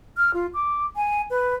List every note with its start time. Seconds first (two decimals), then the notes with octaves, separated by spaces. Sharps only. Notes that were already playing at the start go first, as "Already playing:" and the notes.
0.17 F6
0.34 F4
0.54 D6
0.96 G#5
1.30 B4